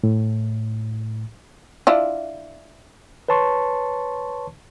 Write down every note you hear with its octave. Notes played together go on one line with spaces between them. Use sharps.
A2
D4 E4 F4
B4 C#5 A5 C6 C#6